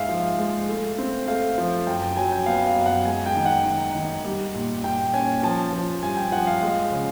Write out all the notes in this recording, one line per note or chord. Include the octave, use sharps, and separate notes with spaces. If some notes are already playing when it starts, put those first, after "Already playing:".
Already playing: G#2 G#3 E5 F5
F3
G#3
A3
C4
A3 F5
F3
F#2 G5
G5
F#3 G#5
G5
B3 F5
F5
F#2
F#5
G#3 G#5
G5
D#3
F#5
D#3
D#3
G3
A#2
A#2 G5
C#4 G#5
F3 A5
F3
G2 G#5
G5
F3 F#5
F5
G#3
C#3